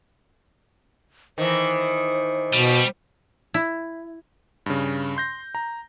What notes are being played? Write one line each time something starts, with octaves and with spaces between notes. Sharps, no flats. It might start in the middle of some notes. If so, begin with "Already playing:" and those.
D#3 E3 C5
B2 G3
E4
G2 C#3
C6 G6 A#6
A#5